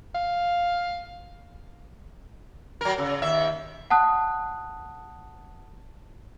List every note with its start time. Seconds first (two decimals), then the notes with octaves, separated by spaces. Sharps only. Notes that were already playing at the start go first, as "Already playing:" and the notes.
0.15 F5
2.81 F#3 A#4
2.98 C#3
3.22 D#2 E5
3.90 F#5 A5 D#6 F#6